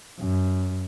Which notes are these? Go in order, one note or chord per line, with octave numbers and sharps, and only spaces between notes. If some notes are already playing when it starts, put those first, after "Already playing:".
F#2